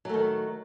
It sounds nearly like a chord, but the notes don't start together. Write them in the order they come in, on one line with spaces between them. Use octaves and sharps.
F#3 A3 D#3